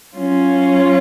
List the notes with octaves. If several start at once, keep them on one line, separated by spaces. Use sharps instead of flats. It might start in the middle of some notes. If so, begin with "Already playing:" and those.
F#3 C#4 F4